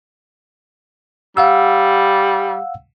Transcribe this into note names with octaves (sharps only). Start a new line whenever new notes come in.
G3 F5 F#5 E6